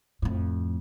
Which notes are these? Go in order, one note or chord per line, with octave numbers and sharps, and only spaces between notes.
F2 A2